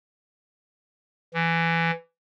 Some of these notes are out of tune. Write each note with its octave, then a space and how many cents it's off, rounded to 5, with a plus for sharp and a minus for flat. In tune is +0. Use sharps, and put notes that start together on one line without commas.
E3 +15